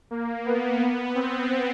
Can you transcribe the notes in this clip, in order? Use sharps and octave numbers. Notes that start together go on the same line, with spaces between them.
A#3
B3
B3
C4